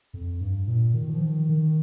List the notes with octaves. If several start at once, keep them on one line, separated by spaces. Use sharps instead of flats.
F2
G2
A#2
D#3
F3
D#3
D#3